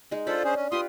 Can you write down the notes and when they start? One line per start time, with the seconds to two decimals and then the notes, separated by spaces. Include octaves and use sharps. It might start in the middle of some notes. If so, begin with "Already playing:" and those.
0.11 G#3 D#4
0.27 D4 F4 A4 C5 B5
0.44 C#4 G#4 C5
0.56 C#4
0.72 F4 G4 B4 C6 D#6